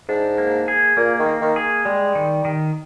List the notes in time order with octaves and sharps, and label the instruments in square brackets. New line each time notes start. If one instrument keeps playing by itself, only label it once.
[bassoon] G#2 [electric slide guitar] D4
[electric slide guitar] A#3
G#4
[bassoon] A#2 [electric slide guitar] A#3
[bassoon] D#3
[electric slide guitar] A#3
[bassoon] D#3
[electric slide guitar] G#4
[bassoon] G3 [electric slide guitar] G#3
[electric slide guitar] D#3
D#3